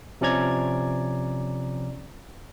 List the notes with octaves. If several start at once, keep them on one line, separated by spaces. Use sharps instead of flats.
C3 F3 C#4 D5 A#5 G#6